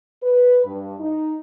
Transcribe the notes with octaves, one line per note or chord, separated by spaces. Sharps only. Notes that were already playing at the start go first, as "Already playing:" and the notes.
B4
G2
D#4